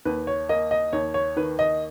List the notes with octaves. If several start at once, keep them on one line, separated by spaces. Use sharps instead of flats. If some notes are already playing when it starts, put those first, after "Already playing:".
D#2 B4
C#5
A#3 D#5
D#5
D#2 C#5
C#5
D#3 B4
D#5